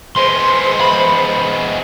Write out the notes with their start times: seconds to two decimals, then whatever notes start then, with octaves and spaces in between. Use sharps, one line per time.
0.16 G#3 B3 C5 C6
0.81 B5